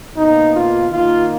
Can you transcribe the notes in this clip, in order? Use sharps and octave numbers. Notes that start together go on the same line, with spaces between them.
B2 A#3 D#4
F4
D#3 A#3 F4